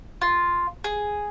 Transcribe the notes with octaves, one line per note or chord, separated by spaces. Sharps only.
F4
G#4